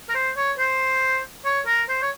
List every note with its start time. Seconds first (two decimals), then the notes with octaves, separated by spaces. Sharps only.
0.09 A#4
0.15 C5
0.37 C#5
0.58 C5
1.45 C#5
1.67 A#4
1.89 C5
2.02 C#5